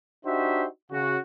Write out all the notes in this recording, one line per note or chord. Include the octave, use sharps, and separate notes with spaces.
D4 D#4 F#4 G4 C5 E5
C#3 F#4